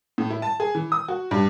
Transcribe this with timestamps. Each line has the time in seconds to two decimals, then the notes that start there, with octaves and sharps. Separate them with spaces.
0.18 A2
0.30 E4
0.42 A5
0.60 G#4
0.75 E3
0.92 D#6
1.08 F#4
1.31 G2